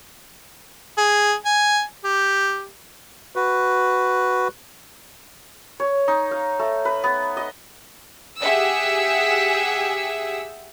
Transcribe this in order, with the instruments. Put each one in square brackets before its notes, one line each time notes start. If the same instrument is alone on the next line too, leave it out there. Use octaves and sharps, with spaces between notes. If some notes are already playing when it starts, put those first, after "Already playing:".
[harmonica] G#4
G#5
G4
[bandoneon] F#4 B4
[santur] C#5
D#4
F5
A3
B4
B3
D#5
[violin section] G4 G#4 E5 F#5 E6